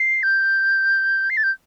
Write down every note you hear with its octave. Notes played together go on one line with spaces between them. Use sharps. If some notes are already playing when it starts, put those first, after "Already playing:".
Already playing: C7
G6
C7
A6
G6